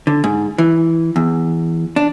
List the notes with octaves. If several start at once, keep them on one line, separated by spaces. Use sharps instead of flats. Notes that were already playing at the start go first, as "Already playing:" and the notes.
D3
G#2
E3
E2
D4